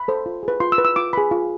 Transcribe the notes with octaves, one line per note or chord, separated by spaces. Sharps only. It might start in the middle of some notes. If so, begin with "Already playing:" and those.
Already playing: B5
A4 C5
F4
G#4
B4
F4 C6
E6
B4
E6
F4 D6
G#4 B4 B5
F4